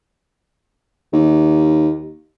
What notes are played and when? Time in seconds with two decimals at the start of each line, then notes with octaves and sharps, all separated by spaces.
1.13 D#2